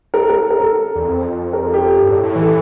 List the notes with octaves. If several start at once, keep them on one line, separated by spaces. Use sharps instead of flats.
A#4
A4
A#4
A#4
A4
E2
F2
A#4
A4
G4
A4
G2
A2
A2
E3
A4